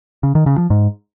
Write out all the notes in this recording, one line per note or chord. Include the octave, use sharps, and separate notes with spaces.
C#3
D#3
C#3
F3
G#2